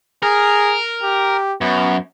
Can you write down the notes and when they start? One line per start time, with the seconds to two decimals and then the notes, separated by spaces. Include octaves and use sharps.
0.23 G#4 A#4
1.03 G4
1.61 F#2 B3